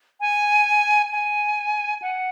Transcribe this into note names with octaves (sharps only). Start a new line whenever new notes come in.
G#5
G#5
F#5